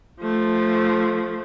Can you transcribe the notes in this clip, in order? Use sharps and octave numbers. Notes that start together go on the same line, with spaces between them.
F3 A3